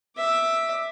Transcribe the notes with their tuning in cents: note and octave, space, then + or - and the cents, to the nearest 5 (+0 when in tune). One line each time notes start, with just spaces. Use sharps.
E5 +0 D6 +15